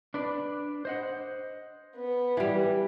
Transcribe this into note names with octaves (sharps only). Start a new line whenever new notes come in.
D4 B4 D5
C5 D#5 F#5
B3
E3 G3